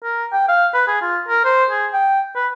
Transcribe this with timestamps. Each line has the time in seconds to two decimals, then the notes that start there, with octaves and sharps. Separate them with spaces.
0.04 A#4
0.33 G5
0.48 F5
0.74 B4
0.88 G#4
1.02 F4
1.29 A#4
1.45 C5
1.71 G#4
1.94 G5
2.36 B4